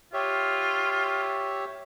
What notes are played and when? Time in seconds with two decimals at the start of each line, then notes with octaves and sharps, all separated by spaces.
0.13 F4 G4 C#5 E5